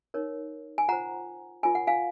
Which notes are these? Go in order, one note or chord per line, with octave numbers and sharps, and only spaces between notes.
D#4 A#4 C#5
G#5
F4 C5 F#5 A#5
F4 A#4 C#5 G#5
F#5
F5 G#5